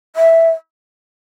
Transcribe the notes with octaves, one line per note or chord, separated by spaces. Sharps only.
E5